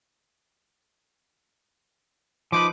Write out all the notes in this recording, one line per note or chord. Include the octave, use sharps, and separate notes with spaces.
F3 D#4 B4 D6